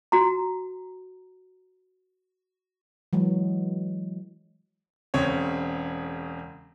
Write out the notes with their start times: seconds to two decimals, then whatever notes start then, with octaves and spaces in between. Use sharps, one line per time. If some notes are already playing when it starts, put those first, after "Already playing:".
0.12 F#4 A#5
3.13 E3 F#3 G#3
5.14 E1 C#3 C4 C#5